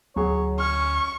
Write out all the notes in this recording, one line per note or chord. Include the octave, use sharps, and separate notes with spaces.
D2 F#3 G#4 C#5
C#4 C#6 F6